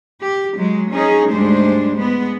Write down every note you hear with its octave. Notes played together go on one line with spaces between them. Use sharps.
G4
F#3 G#3
C#4 D#4 G#4
D2 G#2 G3 G#3 D4 C5
G#3 B3